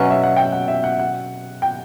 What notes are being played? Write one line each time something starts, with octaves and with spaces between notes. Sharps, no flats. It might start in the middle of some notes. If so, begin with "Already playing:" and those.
Already playing: B2 F#3 C#4 E5
E5
F#5
G5
F#5
E5
F#5
F#5
G5